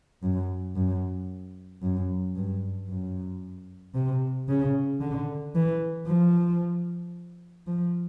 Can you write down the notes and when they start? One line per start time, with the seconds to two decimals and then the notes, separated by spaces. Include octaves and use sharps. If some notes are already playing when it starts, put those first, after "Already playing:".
0.23 F#2
0.76 F#2
1.82 F#2
2.36 G2
2.89 F#2
3.94 C3
4.48 C#3
5.01 D3
5.55 E3
6.07 F3
7.67 F3